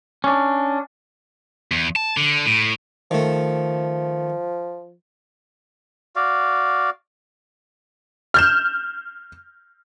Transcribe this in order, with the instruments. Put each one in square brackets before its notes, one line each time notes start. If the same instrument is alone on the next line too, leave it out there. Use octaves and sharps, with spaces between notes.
[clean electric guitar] C#4 D4
[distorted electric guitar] E2
A5
D3
A2
[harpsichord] D#3 A3 [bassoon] F3
[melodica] F#4 D5 F5
[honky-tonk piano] F6 G6 E7